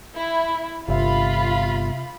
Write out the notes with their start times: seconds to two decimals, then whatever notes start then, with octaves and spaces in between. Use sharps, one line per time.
0.16 E4
0.88 G1 C3 F4 E5 B5